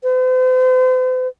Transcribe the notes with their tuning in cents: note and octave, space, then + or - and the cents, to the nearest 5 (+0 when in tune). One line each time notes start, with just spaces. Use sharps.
C5 -45